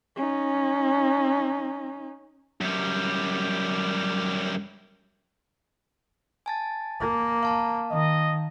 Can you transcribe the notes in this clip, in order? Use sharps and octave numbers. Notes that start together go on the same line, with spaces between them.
C#4 D#4
F#2 G3
G#5 A5 A6
A#3
F5 A5 A#5
D#3 D#5